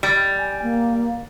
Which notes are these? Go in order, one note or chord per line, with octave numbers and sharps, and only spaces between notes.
G3
G#5
A#3